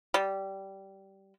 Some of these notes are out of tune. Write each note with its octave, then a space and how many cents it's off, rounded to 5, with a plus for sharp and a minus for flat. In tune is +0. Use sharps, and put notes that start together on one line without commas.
G3 -15